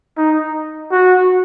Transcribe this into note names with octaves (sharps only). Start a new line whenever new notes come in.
D#4
F#4